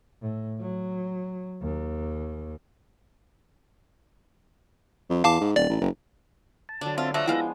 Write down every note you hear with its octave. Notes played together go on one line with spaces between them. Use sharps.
A2
F#3
D#2
F2
E2 F5 A5 D6
G#2
D#1 D5
A1
F#1
A5
D3 F#3 D4
C4 F4 E5 A5
F3 G3 A3 D4 D#5 E6 F#6 A#6
F3 G#3 B3 E4 B4 F5 G5